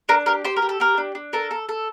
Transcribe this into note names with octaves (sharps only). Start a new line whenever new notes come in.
D4 A#4
G4 A#4
G4 C5
A#4
G4
A4
G4 A#4
D4
D4
A4 A#4
A4
A4